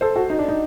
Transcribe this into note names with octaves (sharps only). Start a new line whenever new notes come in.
A4 C5
F#4 A4
D#4
D4
D#4